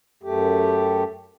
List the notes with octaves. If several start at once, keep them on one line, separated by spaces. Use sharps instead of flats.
F#2 A3 G4